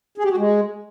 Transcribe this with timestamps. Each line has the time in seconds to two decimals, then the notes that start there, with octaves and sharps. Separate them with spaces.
0.18 G#4
0.24 G4
0.31 F#4
0.37 G#3